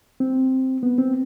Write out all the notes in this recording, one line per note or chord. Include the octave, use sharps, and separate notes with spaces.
C4
B3
C4